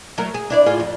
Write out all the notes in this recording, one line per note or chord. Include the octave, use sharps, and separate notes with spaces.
F#3 A3 A#4
G#4
D4 E4 D5
A2 F4 G#4
F2